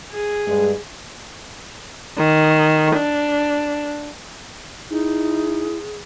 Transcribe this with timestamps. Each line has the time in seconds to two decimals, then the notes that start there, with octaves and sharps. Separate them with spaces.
0.11 G#4
0.47 G2 G#3
2.18 D#3
2.96 D4
4.90 D#4 E4 G#4